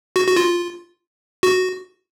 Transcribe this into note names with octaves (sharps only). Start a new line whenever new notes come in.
F#4
F#4
F4
F#4